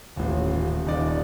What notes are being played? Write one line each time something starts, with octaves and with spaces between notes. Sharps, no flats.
D#1 A1
D#1 D#4 D5